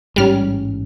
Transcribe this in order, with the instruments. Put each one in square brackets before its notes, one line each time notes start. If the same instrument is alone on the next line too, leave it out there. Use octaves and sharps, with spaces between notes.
[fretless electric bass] A1 G#2 C#4 [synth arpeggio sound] G3 F6